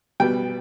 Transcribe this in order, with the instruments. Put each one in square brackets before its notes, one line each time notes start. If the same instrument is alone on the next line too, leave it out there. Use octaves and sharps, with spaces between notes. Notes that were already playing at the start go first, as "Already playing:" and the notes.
[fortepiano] B2 G3 B3 G5